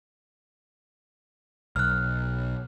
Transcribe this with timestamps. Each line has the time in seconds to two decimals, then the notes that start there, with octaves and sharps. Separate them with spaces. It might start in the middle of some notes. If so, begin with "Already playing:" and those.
1.76 B1 F6 F#6